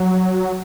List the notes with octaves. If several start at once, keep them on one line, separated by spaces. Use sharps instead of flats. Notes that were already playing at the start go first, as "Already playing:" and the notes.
Already playing: F#3